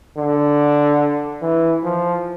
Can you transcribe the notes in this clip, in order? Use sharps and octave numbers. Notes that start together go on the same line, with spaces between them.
D3
E3
F3